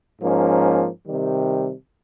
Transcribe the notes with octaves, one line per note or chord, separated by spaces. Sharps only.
G#2 F3 A#3 C#4
C3 D#3 G3